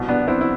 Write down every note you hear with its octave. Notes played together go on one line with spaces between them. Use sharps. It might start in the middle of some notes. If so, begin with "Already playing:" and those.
Already playing: C2 B2
B3 D4
C4 E4
E4